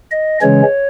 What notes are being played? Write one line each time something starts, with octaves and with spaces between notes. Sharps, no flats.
D#5
C#3 E3 G#3 C#4 C#5